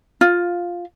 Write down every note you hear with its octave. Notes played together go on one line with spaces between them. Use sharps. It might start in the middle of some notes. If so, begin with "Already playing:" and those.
F4